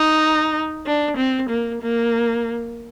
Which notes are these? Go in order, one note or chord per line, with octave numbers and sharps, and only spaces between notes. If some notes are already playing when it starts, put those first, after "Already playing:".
Already playing: D#4
D4
C4
A#3
A#3